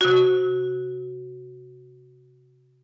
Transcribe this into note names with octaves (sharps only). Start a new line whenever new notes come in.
C3 F#4